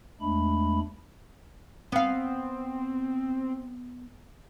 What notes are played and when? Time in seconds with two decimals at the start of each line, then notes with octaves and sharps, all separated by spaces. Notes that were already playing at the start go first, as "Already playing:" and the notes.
0.21 E2 G#3 A3 D4 B5
1.92 B3 C4 F5